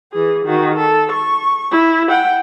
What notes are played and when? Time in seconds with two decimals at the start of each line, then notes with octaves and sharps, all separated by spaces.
0.12 E3 G#4
0.46 D#3 F#4
0.76 A4
1.12 C#6
1.71 E4
2.09 F#5 G5